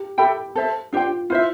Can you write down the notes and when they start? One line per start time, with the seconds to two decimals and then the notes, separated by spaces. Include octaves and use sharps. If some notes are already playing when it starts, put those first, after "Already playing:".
Already playing: G4
0.18 G4 A4 E5 G5 B5
0.56 A4 C5 E5
0.93 D4 F4 G4 C5 G5
1.30 E4 F4 C5 E5